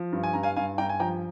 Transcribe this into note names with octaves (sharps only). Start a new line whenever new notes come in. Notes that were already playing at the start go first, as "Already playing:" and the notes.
Already playing: F3
G2
G#5
G2 A#5
F5 G#5
G2 F5 G#5
G2 G5 A#5
G#5
F3 G5 A#5